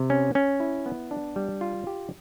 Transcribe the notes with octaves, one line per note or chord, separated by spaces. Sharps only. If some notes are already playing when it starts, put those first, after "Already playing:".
Already playing: C3
C#4
C#4
E4
B3
D4
G3
F4
G4